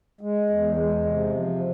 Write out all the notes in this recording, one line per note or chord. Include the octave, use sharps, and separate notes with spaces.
G#3
E2
G#3
C3
F3